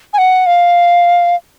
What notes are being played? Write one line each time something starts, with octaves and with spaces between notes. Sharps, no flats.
G#5
F#5
F5